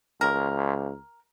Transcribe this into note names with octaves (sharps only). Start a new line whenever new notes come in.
C#2 A#4